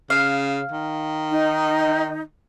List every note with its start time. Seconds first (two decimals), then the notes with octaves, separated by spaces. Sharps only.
0.10 C#3 F5
0.71 D#3
1.31 D#4